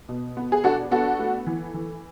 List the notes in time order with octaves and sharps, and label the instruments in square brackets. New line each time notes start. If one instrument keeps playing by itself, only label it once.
[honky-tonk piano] B2
B3
G#4
D4 F#4 A4
B3 F#4 A4
A3
E3
E3